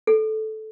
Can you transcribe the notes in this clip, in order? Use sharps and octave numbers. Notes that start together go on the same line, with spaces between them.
A4